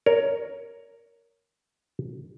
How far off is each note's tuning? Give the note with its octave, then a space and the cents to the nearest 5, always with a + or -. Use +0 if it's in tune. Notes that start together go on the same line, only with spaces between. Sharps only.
A#4 +0 C#5 +15